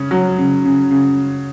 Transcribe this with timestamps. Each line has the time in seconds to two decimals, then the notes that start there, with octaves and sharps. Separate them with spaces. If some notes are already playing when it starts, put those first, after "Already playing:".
Already playing: C#3 C#4
0.11 F#3
0.38 C#3
0.65 C#3
0.91 C#3